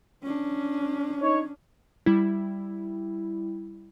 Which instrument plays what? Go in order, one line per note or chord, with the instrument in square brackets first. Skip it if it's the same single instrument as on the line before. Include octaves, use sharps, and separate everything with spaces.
[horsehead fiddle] C#4 D4
[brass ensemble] D#4 C#5
[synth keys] G3 E4